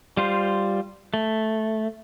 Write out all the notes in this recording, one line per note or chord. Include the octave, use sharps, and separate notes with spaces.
G3 F4 C5
A3